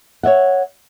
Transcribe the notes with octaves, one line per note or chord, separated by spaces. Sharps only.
C#5 D5 E5 F#5